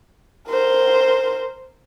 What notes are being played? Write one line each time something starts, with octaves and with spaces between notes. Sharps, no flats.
A#4 C5